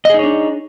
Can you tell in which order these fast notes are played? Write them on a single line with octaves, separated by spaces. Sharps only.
D#5 G#4 D#4 C#5 D4